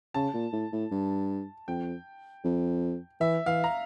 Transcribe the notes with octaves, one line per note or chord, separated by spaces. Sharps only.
C#3 A5
A#2
A2
A2
G2
F2 G5
F2
E3 E5
E3 F5
A#5